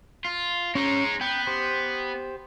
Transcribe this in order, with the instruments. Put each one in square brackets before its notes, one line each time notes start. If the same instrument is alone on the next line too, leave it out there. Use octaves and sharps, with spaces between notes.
[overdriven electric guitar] F4
[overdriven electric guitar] G#3 D#4 [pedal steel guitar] C#4
[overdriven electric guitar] B3 [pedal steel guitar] G5
[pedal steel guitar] G4 C5